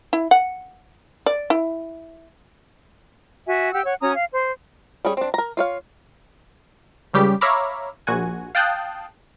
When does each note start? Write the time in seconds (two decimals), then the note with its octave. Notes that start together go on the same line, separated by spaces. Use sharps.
0.13 E4
0.31 F#5
1.26 D5
1.50 E4
3.46 F#4 E5 G#5
3.72 G4 F#5 G5 E6
3.84 C#5 F#5
4.01 C#4 F#4 A#5 D#6
4.14 F5
4.32 C5
5.05 G3 C#4 G#4
5.17 C4 D4
5.34 A#4 A#5
5.57 F4 C#5 F5
7.14 C#2 C#3 G3 G4 B6
7.41 C#5 E5 F5 A#5 B5 D6
8.07 A#1 F#4 G#5
8.55 F5 G5 A5 D#6 F#6 G6